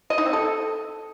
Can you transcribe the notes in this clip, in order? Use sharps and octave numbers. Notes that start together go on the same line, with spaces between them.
D#5
D#4
C4
A4